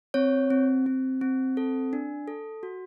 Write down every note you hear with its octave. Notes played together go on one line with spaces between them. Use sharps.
C4 C#5
C4
C4
C4
A4
D4
A4
F#4